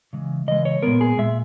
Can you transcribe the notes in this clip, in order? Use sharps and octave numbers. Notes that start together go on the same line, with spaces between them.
C#3 E3 G#3
C#3 E3 G#3 D#5
C#5
A#2 G#3 B3 A#4
G#4
A#2 G#3 E5